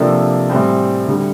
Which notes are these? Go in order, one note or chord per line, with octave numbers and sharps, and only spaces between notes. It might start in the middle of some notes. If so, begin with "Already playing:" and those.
Already playing: C3 F3 A#3 D4 A4
A2 E3 G3 C4
D2 D3 G3